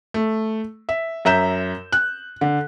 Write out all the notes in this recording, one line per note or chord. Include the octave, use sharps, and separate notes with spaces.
A3
E5
F#2 E5 A#5 G6 E7
F#6
D3